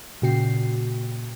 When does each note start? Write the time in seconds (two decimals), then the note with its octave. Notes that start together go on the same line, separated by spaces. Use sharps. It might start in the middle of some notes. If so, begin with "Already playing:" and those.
0.22 A#2 C#3 F#4 G5 C7